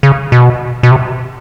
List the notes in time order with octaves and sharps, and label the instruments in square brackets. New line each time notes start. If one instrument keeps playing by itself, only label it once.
[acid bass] C#3
B2
B2
C3